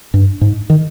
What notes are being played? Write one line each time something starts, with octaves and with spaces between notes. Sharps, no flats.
G2
G#2
D#3